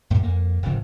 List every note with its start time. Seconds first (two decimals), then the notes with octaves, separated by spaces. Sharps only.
0.10 F#2 A#2 C#3
0.23 F2 A#3
0.62 D1 G#1 C#3 F3